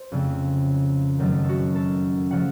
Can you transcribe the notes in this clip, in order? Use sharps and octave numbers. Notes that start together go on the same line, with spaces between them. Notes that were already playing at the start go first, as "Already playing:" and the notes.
Already playing: C5
F2 C#3 A3 C4
F#2 D#3 F#3 A3 A4
A4
F#4
A4
C#3 F3 A3 F#5